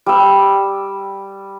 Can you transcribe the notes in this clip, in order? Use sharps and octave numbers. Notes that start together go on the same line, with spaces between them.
G3 E6